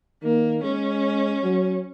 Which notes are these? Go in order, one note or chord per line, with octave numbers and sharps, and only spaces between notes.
D#3 A#3
G#3 C#4
F#3